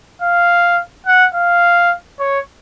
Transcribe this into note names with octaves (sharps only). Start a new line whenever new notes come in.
F5
F#5
F5
C#5